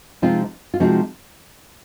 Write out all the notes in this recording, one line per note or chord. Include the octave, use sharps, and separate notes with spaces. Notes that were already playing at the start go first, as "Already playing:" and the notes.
C3 F3 G#3 C4 D#4 F4
F4
C3 F3 G#3 C4 D#4 F#4